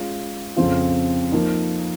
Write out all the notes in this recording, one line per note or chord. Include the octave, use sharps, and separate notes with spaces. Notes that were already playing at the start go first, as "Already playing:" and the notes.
Already playing: G#3 C#4 F4
F2 C#3 F3 C4 F4
F3 A#3 D#4